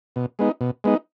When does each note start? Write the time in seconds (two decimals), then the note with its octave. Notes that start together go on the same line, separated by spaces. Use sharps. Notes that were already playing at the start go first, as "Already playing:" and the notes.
0.16 B2
0.39 G#3 B3 D#4
0.61 B2
0.84 G#3 B3 D#4